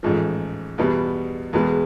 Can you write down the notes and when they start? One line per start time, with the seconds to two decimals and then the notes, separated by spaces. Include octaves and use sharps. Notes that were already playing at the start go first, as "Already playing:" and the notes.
0.03 A1 G#2 F3
0.78 E2 B2 G3
1.53 E2 B2 G#3